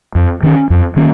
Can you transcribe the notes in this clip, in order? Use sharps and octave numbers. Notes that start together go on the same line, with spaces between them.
F2
D#3 A#3 C#4
F2
D#3 A#3 C#4